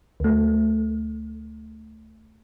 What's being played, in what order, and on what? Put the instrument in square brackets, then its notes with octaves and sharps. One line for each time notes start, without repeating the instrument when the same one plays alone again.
[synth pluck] D2 A3